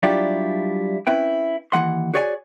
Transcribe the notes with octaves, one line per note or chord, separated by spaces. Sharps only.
F#3 G3 D4 E4 F4 G4
C4 C#4 E4 B4 G5
D#2 E3 F#3 F#5 C6
F#4 G#4 C#5 D5 E5 G#5